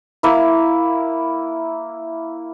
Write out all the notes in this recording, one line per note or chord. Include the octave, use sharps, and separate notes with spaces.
A#3 E4